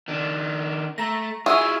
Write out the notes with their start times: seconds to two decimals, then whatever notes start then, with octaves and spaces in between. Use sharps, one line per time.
0.08 D#3 D4
0.98 A3 A#5 A#6
1.46 E4 F4 G#4 E5 C#6 E6 D#7